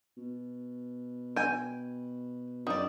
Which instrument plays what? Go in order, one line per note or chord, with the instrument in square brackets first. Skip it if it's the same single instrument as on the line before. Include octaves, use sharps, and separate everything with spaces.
[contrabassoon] B2
[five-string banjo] G5 G#5
[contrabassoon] F#2 [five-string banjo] D#3 D5